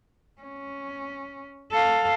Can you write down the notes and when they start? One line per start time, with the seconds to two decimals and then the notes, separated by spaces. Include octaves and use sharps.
0.42 C#4
1.72 A4 F5